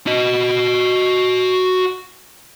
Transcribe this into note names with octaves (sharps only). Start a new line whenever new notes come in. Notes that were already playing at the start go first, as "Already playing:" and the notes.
F#4 D#5